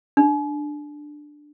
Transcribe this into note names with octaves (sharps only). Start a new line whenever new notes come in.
D4